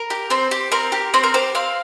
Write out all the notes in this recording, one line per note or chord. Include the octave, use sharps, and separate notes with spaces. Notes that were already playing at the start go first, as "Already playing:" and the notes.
Already playing: A#4
G4
C4 C5
G4
C4 A#4
G4
C4 C5
A#4
G4 C5
C4 F5